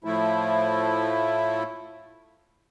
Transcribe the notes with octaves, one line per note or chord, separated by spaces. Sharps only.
A2 F3 A3 E4